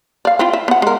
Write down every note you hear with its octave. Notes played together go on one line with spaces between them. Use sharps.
D5 F5
C4 E4 F4
E5
B3 F#5
G#3 A#4